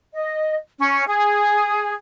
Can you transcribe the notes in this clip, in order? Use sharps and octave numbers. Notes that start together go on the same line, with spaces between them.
D#5
C#4
G#4